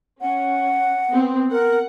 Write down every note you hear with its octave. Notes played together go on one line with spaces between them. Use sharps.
C#4 F#5
B3 C4
A#4 F#5